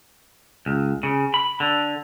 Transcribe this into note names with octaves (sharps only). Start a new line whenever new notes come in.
C#2
C#3
B5
D3